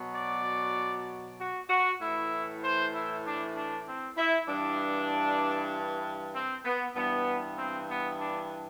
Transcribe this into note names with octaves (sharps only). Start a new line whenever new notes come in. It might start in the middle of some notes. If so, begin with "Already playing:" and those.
Already playing: B2 F#3
D5
F#4
F#4
A2 E3 E4
C5
E4
D4
D4
C4
E4
G2 E3 D4
C4
B3
G2 E3 B3
C4
B3
D4